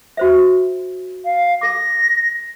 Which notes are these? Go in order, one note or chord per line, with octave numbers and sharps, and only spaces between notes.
F#4 C5 E5
F5
A4 D6 A#6